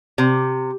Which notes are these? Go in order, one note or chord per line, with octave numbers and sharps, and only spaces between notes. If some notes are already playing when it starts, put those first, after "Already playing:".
C3